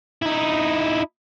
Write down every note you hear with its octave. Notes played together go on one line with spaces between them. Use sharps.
D#4 E4